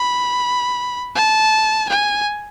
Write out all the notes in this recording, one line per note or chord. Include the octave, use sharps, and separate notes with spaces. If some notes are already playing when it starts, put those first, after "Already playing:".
Already playing: B5
A5
G#5